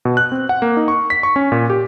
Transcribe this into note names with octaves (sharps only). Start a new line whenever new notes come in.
B2
F#6
C4
F#5
A#3
D#4
C#6
B6
C#6
C#4
A#2
G4